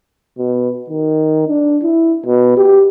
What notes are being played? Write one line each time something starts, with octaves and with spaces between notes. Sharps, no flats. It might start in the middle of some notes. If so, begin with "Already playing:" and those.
B2
D#3
D4
E4
B2
G4